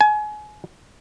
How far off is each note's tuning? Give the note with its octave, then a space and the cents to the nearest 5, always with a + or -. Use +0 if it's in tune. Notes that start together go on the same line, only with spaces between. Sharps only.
G#5 +30